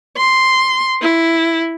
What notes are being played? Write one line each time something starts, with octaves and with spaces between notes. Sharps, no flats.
C6
E4